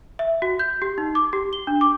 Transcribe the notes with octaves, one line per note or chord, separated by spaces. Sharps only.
E5
F#4
G6
G4
D#4
D6
G4
G7
D4
D6